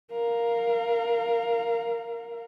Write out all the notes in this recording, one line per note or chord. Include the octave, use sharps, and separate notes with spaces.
A#4 F5